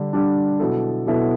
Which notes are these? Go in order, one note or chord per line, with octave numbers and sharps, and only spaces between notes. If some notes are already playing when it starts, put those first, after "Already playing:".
Already playing: D3 G3 D4
D3 G3 D4
B2 F#3 B3 E4 A4
B2 F#3 B3 E4 A4